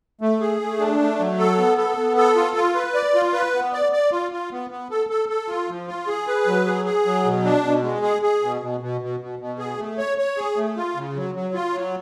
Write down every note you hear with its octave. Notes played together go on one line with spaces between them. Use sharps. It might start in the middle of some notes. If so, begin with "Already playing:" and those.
A3
G#4
A3
D4
A3
F#3
A4
B3
A4
B3
A4
F4
F4
B4
D5
F4
B4
B3
D5
D5
F4
F4
B3
B3
A4
A4
A4
F4
F3
F4
G#4
B4
F#3
G#4
G#4
F#3
B2
D4
B2
G#3
G#4
G#4
B2
B2
B2
B2
B2
B2
G#4
A3
C#5
C#5
G#4
A3
F4
C#3
F#3
F#3
F4
F#3